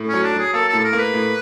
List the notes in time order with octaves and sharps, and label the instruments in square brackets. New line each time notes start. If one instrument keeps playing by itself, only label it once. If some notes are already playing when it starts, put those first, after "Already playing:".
Already playing: [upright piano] A2
[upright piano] F#3 [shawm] C#4
[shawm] D4
[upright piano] F#3
[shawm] G#4
[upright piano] A#3 [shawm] A4
[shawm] A4
[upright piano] A2
[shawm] A4
A#4
[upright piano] A#3
[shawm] B4
[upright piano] A2